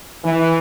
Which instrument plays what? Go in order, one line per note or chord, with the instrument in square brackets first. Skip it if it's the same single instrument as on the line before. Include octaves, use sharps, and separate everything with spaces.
[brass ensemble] E3